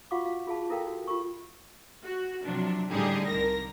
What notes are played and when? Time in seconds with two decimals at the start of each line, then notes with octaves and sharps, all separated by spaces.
0.11 F4 F#4 F5 F#5 C#6 D6
0.25 F5
0.47 F4 G#4 F5 A5
0.69 E4 A4 A#4 F5 G5
0.87 F#4
1.07 F4 G4 A#4 C#6
2.04 F#4
2.45 C3 F3 F#3 D4
2.91 A2 D3 G3 D#4 G4 G#4
3.28 C2 D3 A#4 A#6